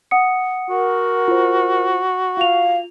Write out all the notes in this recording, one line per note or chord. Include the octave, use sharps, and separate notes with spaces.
F#5 D#6 C#7
F#4 A#4
F4 C5
F4 F5 F7